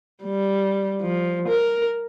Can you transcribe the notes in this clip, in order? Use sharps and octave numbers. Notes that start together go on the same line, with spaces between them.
G3
F3
A#4